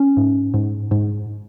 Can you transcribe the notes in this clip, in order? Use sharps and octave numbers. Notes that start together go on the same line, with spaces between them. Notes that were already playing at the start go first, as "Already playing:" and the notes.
Already playing: C#4
G#2
G#2
G#2